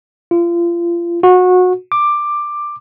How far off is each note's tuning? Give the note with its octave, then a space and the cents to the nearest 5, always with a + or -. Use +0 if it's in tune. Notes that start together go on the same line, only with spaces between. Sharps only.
F4 -30
F#4 -25
D6 +10